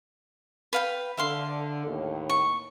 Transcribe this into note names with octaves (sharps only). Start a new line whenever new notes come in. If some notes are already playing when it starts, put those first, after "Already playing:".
B4 F5 G5
D3 E5 F5 C6
D#2 A2
C#6